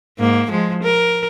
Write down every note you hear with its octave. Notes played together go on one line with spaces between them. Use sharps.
G#2 A#3
F3 G#3
A#4